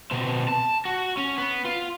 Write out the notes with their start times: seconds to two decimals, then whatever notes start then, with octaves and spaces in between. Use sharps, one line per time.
0.11 B2 C4
0.48 A5
0.85 F#4
1.17 C#4
1.38 B3
1.65 F4